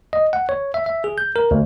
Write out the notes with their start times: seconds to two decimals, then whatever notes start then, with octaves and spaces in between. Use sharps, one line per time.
0.13 D#5
0.33 F#5
0.49 C#5
0.74 E5
0.86 E5
1.04 G#4
1.18 G6
1.36 A#4
1.51 D2